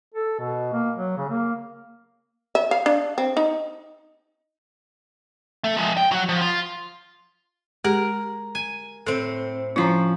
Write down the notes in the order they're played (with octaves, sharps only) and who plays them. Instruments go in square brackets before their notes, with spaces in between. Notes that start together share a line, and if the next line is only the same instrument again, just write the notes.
[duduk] A4
B2
A#3
F#3
C#3
A#3
[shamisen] E5
F5
D4
C4
D#4
[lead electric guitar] A3
F3 G#3
G5
F#3 F#4
F3
F4
[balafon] G#3 G4 G#4 [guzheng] A#4
[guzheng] G#5
[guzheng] A2 C4 [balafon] A4
[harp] F3 C#4 [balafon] E4 C#5 A#5